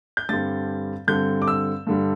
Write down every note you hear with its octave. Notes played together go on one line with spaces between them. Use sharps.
G6
G2 D3 G3 C4 A6
G2 D3 G3 C4 G6
D6
E6
G2 D3 G3